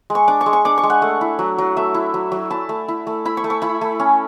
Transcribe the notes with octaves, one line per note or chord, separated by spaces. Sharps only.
G#3
C#6
D4 D6
C#6
G#3
C#6
D4 D6
C#6
G#3
F#5
A3
E4
F#3
F#3
A3 E5
E4
F#3
F#3
E4 A5
A3
E4
A3
E4 B5
C#6
A3
C#6
E4 B5
A3
C#4